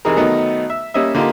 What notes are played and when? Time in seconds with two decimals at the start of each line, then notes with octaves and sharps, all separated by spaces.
0.05 C3 E3 D#4 G#4 A#4
0.17 D#3 F#3 A3 B3 D#4
0.70 E5
0.94 G3 A#3 C#4 D#5 E5
1.15 D3 A#3 D#4 F4 G4 A#4